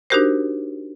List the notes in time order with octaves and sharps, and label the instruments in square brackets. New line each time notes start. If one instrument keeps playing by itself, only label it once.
[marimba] D4 D#4 F#4 G4 A#4 C5